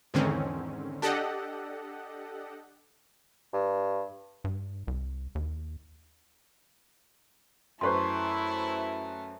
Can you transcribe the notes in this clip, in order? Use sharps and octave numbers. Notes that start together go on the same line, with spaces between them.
E2 G#2 D3 D#3 C4 C#4
D4 G4 A4 D#5 F#5
G2
G2
C2
D#2
F#2 A3 E4 B4 C5 C6 C#6